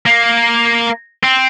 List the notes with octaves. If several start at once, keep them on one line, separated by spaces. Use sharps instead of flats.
A#3
C4